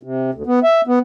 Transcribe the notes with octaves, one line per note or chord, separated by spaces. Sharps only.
C3
D2
B3
E5
B3